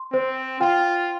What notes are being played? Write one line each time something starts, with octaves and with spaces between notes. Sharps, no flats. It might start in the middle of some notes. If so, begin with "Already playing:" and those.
Already playing: C6
C4 C5
F4 G5